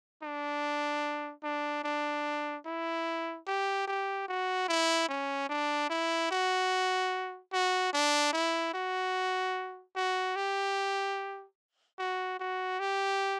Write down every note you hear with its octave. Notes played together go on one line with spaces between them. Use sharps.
D4
D4
D4
E4
G4
G4
F#4
E4
C#4
D4
E4
F#4
F#4
D4
E4
F#4
F#4
G4
F#4
F#4
G4